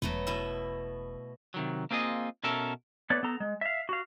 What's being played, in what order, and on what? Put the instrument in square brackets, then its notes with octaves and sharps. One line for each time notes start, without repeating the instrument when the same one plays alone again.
[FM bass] E1 [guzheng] F#3 A3 B3
[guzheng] B2 E4
[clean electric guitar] C3 D#3 F#3
A#3 C4 F4 G#4 D#5
B2 C#4 A4 A#4 E5
[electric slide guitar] A3 B3 B4 C#5 D5
B3 A4 A#5
G#3
E5 F5
F#4 F5